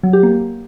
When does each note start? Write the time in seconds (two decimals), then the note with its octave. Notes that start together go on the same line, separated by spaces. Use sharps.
0.03 F#3
0.13 G4
0.23 A#3